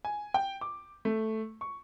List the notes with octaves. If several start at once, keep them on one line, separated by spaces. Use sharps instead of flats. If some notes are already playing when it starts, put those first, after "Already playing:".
G#5
G5
D6
A3
C#6